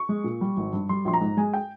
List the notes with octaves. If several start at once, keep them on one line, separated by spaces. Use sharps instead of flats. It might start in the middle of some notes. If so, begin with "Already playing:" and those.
Already playing: C#6
G#3
A#2
G3
G#1
G2
G3 C6
A#1 C6
A#5
G#2
G#3 G#5
G5